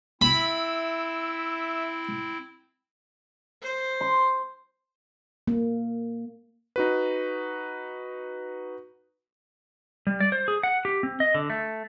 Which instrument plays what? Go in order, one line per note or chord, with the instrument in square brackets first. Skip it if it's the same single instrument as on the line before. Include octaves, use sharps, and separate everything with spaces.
[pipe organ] C4 E4 [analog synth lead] E5 [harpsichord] B5
[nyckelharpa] C5
[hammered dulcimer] C6
[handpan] A#3
[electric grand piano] D#4 F#4 B4
[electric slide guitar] G3
D5
C5
G#4
F#5
G4
C4
D#5
D3
A3